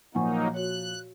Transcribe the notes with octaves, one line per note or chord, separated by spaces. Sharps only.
A#2 F3 F#3 A#3 D#4 F#5 G#5 C#6
F#4 C#5 F#6